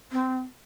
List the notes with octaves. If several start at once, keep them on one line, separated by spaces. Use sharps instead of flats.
C4